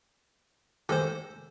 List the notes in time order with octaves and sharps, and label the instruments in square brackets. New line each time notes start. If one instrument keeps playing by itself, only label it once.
[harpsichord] D#3 G#3 [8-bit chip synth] A4 C5